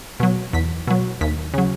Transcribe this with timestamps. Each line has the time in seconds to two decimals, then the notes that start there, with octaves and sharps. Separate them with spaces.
0.20 B2 F#3
0.53 E2 B6
0.87 B2 F#3
1.21 D#2 B6
1.54 C#3 F#3